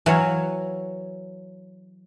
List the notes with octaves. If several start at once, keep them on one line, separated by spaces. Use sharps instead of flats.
E3 F#3 C#5 F5